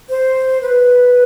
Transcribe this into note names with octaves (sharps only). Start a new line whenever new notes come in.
C5
B4